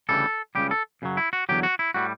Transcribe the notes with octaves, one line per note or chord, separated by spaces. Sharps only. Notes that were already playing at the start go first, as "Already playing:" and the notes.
D2 C#3 E3 G3 A4
C#2 C#3 G3 G4
A4
F#2 C#3 F#3
E4
F#4
E2 D3 F#3 G4
F#4
E4
A2 G3 F#4